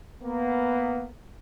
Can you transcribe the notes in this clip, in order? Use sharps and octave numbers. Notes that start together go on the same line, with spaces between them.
A#3 B3